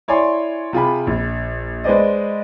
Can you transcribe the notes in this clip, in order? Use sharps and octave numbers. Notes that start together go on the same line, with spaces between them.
E4 C#5 D5 G#5 C6
C3 F4 G#4 B5
A#1
G#3 B4 C5 D5 D#5